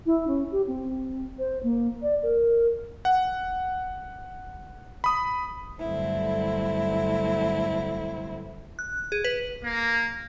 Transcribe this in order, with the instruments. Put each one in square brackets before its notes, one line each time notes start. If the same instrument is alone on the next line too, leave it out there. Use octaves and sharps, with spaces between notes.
[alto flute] E4
C#4
G4
C4
C5
A#3
D5
A#4
[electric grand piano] F#5
B5 D#6
[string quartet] G2 D3 F#3 A3 C4 E4
[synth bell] F#6
G#4
B4
[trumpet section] A#3